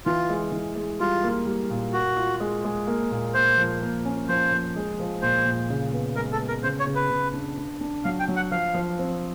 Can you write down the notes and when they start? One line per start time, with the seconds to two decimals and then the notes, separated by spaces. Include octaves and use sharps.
0.06 E3 F4
0.30 G#3
0.52 E3
0.76 G#3
1.00 G3 F4
1.24 A#3
1.46 G3
1.70 A#2
1.93 F#4 A#4
2.17 F4
2.40 G#3
2.65 G#3
2.87 A#3
3.11 A#2
3.34 A#3 C5
3.58 F3
3.82 A#3
4.05 C#4
4.29 F3 C5
4.52 F3
4.76 G#3
5.00 F3
5.22 A#2 C5
5.46 A#2
5.70 C#3
5.93 B3
6.16 G#3 A#4
6.32 A4
6.41 B3
6.48 A#4
6.63 C#3 C5
6.80 C#5
6.87 C#3
6.95 B4
7.10 C#3
7.34 D4
7.58 D4
7.81 D4
8.04 F#3 F5
8.20 G5
8.28 F#3
8.36 F#5
8.51 F3 F5
8.74 F3
8.99 C4